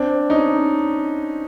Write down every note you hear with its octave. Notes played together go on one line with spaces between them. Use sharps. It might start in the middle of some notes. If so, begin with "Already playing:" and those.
Already playing: C4 D4
C#4 D#4